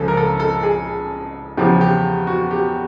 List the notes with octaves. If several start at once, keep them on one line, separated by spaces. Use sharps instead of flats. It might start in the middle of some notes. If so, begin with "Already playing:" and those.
Already playing: C#2 C#3 F3 G#4 A4
A#4
A4
A4
G#4
E2 C#3 F3 G4
G4
F#4
G4